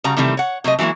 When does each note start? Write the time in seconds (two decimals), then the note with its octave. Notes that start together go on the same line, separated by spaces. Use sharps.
0.04 C#3 G3 F#4 A#5
0.17 C3 D#3 E3 F#3 G3 A3
0.37 C#5 F#5
0.64 C3 F#3 A3 D#5
0.79 E3 F#3 G#3 A#3 E4